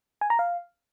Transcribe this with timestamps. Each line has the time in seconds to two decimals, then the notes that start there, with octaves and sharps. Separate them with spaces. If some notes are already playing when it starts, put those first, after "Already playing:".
0.21 G#5
0.30 A#5
0.39 F5